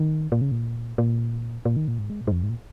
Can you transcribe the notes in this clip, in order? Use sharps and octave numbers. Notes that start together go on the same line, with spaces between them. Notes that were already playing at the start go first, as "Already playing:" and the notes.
Already playing: D#3
A#2
C#3
A#2
A#2
A#2
D#3
A#2
G#2
G#3
A#2
G#2
F2
G#2
A#2